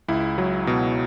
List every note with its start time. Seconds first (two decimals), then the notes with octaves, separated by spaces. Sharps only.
0.08 C#2 E4
0.38 F#3
0.67 B2